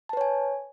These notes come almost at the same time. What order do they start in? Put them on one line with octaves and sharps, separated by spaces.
A5 B4 C#5 G#5